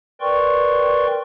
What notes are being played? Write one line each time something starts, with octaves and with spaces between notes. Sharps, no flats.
A#4 B4 D5 G5 C6 C#6